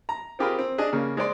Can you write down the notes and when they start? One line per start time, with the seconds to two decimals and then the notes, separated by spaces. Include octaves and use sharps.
0.09 A#5
0.39 C4 F4 G4 G#4 A#4 B5
0.59 C4
0.78 D4 G#4 D#5
0.93 C#3 A#3
1.17 G#3 C5 D5 C6